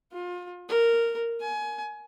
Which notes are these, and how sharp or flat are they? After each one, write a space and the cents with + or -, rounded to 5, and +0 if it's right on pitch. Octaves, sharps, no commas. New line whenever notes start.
F4 +30
A#4 -10
G#5 +25